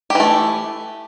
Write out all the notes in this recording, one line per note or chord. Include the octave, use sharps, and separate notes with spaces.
E3 A3 G4